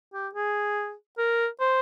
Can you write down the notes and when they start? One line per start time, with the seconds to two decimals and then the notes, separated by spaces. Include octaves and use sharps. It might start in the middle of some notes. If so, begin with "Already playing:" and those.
0.14 G4
0.35 G#4
1.18 A#4
1.60 C5